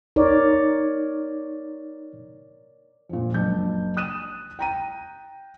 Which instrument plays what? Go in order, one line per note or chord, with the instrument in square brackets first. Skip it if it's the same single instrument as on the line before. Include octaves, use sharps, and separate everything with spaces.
[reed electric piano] D#4 [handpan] A#4 C#5 D5
[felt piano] F2 A#2
F#1 D4 G6
D#6 F#6 D#7 E7
G5 A#5 D#7